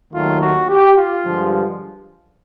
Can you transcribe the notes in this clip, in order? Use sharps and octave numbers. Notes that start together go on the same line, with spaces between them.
D#2 D#3 F#3 A3 F4
F#4
G4
F4
G2 D3 F3 G#3